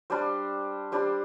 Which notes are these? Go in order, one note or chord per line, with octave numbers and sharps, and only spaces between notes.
G3 D4 G4 C5
G3 D4 G4 C5